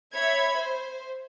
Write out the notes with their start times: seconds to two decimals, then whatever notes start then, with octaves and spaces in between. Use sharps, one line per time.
0.15 C#5 E5 B5 G#6
0.59 C5